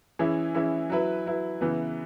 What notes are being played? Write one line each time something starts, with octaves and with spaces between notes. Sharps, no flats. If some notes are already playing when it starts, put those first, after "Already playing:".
E3 C#4 E4 G#4
E3 C#4 E4 G#4
F#3 E4 B4
F#3 E4 B4
C#3 E3 B3 E4